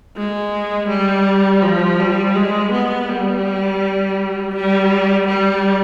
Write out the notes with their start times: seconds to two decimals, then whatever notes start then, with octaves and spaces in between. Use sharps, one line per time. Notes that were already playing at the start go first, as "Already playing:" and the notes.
0.16 G#3
0.89 G3
1.62 F3
2.00 G3
2.35 G#3
2.73 B3
3.09 G3
4.55 G3
5.27 G3